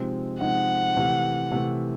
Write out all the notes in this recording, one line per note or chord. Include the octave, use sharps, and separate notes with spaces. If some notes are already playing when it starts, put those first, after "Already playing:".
Already playing: C3 F3 G#3 C4 D#4
C3 F3 G#3 C4 D#4 F#5
C3 E3 A3
C3 E3 A3